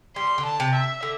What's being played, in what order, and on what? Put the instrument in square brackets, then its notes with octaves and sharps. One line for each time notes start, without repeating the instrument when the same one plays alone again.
[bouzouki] G3 [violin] C6
[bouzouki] D3
[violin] A5
[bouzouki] C3
[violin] E5
[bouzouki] D3